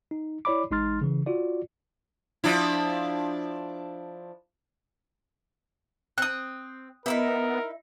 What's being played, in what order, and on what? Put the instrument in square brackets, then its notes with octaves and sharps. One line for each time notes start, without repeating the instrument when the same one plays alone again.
[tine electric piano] D#4
E4 C#5 D5 B5 D6
A1 G#3 D#4 C6 F6 A6
C#3 E3
F4 F#4 D5
[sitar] F3 D4 E4
[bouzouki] C4 [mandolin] D#6 F#6
[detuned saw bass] B3 [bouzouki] D#4 E4 E5 [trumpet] A#4